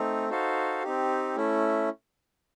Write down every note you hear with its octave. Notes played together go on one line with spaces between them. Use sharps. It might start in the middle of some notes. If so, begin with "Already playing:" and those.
Already playing: A3 C4 D#4
D#4 F#4 A4 C5 F5
C4 D#4 G4
A3 C#4 E4